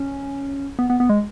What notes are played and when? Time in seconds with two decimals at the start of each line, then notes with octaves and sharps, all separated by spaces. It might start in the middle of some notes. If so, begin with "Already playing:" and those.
Already playing: C#4
0.79 B3
0.90 B3
1.00 B3
1.10 G#3